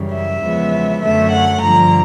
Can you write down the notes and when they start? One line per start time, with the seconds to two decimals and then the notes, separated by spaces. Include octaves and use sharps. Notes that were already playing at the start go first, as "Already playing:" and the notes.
Already playing: F#2 C#3 E3 G3
0.13 E5
0.43 E2 C#3 F3 G#3 B3
1.02 F#2 D3 F#3 A3 E5
1.32 F#5
1.61 G2 D3 F3 A#5